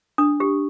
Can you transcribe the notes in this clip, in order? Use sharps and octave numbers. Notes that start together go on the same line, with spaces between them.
D4 D#6
G4